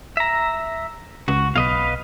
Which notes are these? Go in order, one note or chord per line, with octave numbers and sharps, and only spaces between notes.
E5 A#5
C#2 F#4
B1 B4 D#5 F5